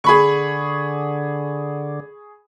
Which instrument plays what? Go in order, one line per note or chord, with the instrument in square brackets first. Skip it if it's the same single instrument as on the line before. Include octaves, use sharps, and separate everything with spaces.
[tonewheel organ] D3 [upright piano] G#4 B5 C#6